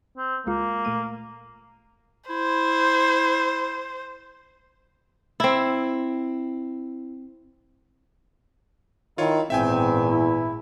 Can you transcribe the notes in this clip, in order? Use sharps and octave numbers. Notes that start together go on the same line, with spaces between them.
C4
C#2 G#3 A#3 F4
A#2 A3 D#7
E4 C5
C4 E4
D#3 E4 F4 C#5
G#1 E2 A#2 C4 E5 G5 G#5
E4